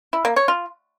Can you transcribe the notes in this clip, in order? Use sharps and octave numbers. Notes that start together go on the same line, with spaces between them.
E4
A#3
C#5
F4